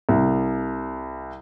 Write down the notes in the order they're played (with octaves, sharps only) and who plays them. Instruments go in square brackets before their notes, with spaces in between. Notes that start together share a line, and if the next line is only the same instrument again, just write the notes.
[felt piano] C2